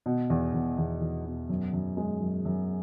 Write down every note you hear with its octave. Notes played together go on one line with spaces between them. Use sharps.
B2
E2
E2
E2
E2
B2
F#2
F#2
G#3
F#2
F#2